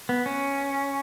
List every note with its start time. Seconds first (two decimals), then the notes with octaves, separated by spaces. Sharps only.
0.09 B3
0.26 C#4